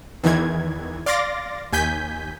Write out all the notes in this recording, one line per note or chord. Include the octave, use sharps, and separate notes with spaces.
E2 D#3 E3 G#6
D5 F5 C6 D6 A6 A#6
D#2 G#5 G6 B6